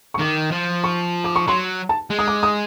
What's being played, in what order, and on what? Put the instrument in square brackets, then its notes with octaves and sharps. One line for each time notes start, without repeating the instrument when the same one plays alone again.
[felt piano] C#6
[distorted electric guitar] D#3 [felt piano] D6
[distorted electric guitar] F3
[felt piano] C#6
D6
C#6
[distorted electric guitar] F#3 [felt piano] C6
[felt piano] A5
[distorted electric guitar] G#3
[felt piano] D#6
D6
D#6